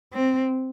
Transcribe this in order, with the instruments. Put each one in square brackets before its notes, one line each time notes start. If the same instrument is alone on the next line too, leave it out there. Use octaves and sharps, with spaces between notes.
[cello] C4